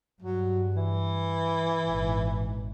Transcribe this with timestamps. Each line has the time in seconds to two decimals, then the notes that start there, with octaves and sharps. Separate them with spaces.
0.22 G2 F#3
0.76 E3
1.86 G#1 A#2